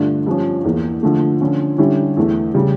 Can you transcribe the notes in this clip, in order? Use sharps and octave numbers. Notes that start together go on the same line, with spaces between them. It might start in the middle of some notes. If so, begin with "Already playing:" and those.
Already playing: G2 D3 A3 D4 F4
G2 F3 C#4
E2 E3 A#3
D3 F3 A3
D3 F3 C#4 F4
D3 G3 C#4 E4
E2 E3 A3
C#3 G3